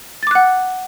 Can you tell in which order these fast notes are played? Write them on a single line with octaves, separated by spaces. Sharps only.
A6 D6 F#6 F#5